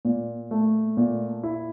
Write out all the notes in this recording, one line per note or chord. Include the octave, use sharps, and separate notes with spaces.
A#2
A3
A#2
E4